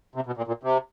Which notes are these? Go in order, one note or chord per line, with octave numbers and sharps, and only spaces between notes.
C3
B2
A#2
A#2
C3